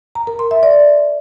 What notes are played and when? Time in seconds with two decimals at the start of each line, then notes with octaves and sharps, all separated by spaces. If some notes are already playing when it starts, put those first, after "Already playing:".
0.15 A#5
0.27 A#4
0.39 C6
0.51 E5
0.63 D5